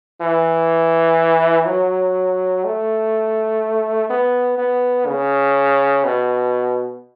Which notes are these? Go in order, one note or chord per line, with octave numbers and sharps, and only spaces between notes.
E3
F#3
A3
B3
B3
C#3
B2